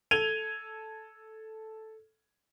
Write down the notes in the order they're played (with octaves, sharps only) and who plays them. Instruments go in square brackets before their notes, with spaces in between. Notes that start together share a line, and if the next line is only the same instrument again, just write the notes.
[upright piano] A4 G#6 D#7 F7 G7